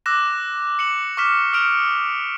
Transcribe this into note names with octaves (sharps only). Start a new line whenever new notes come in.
D6 E6 F#6 A#6 E7
C#7 E7 F#7
C#6 D6 F6 B6 E7
D#6 F6 C#7 D7 F7